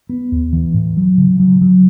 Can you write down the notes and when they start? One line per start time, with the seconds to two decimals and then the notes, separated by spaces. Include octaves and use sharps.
0.09 B3
0.32 D#2
0.53 E3
0.74 A2
0.97 F#3
1.18 C#3
1.40 F#3
1.61 F#3